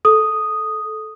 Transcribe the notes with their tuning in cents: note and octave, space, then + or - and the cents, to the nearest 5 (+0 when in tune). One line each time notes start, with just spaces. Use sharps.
A4 -15 D#6 +0